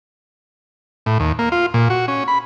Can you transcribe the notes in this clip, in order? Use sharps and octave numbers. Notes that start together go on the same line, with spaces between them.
A2
D#2
A#3
F4
A#2
F#4
C#4
B5